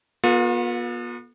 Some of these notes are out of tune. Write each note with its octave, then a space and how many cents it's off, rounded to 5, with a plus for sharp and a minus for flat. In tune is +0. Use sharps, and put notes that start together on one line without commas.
B3 -35 F4 +40 A4 +0